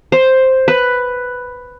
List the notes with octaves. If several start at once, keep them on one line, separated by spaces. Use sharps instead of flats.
C5
B4